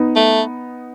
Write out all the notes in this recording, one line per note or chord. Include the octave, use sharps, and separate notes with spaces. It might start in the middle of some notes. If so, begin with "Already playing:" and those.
Already playing: B3 D#4
A3